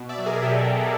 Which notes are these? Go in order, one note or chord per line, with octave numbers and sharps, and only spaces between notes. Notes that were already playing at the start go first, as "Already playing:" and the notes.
Already playing: B2
D5 E5
F#3
G#4 A#4
B2 G4 A4